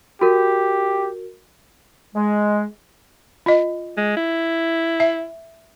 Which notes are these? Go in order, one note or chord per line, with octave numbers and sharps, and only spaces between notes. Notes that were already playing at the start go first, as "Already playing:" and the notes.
F#4 G4 A#4
G#3
F4 D#5
G#3
E4
E5